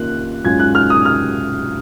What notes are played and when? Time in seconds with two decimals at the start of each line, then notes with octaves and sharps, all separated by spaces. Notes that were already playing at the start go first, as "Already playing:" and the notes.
Already playing: D#3 A#3 C#4 F4 F#6
0.45 G#2 F#3 C#4 F4 G#6
0.59 F#6
0.75 F6
0.90 D#6
1.05 F6